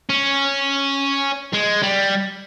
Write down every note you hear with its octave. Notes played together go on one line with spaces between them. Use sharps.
C#4
G#3
G3